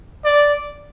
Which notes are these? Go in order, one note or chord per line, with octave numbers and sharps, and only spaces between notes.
D5